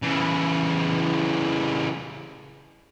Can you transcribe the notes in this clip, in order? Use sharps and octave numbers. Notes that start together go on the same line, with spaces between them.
C#3 E3